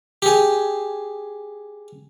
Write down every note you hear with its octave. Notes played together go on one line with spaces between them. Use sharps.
G4 G#4